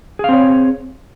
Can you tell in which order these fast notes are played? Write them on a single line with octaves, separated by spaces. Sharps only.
G#4 F5 C4 C#5